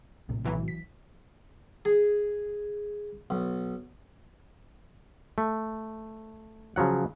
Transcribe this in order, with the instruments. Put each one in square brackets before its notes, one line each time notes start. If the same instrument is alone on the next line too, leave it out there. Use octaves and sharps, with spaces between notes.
[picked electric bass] A#1 A2 C3
[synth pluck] B1 E3 F#3
B6
[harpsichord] G#4
B1
[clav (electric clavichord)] A3
C#3 F3 F#3 F#5